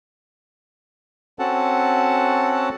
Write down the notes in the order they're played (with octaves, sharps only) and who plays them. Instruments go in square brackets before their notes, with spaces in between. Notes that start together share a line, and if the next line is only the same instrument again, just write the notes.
[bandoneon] C4 C#4 F#4 A4 F#5 A5